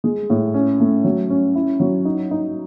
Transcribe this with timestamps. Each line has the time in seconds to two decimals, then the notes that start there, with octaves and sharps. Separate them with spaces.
0.04 G#3
0.30 A2
0.54 C#4
0.80 A3
1.04 F#3
1.30 C#4
1.55 E4
1.80 F#3
2.05 D#4
2.31 D#4